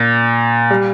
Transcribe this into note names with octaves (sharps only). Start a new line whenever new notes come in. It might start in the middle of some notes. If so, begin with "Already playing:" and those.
Already playing: A#2
G3